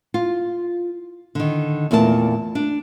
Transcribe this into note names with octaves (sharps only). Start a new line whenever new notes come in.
F4
D3 D#3
E2 A#2 A3 A#4 A5
D4